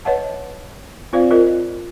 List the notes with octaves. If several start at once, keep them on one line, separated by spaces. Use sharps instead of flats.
B4 C#5 D#5 E5 F#5 A5
C4 F4 C5 D5 F5
F4 A#4 C5 D#5